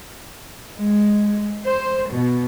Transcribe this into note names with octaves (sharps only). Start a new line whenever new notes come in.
G#3
C5
B2